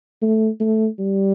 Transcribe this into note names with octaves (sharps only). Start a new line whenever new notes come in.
A3
A3
G3